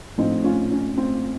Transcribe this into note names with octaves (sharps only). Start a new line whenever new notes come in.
A#1 A2 F3 A3 C4 D#4
C#4 F4
C#4
C4